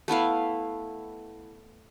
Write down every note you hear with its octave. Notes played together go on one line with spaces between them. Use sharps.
A3 B3 E4 F5